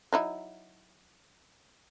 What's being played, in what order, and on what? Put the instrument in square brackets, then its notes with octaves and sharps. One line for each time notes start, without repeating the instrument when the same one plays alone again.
[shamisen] F#3 D#4 E4